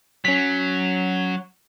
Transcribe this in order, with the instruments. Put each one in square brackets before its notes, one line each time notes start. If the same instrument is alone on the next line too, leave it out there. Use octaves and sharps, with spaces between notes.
[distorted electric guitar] F#3 [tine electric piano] C#4 B6